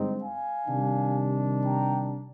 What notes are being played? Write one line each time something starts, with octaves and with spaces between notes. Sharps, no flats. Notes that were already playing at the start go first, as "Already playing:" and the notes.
Already playing: G2 D3 G#3 C4 D#4
F5 G#5
C3 D#3 G3 D4
G5 A#5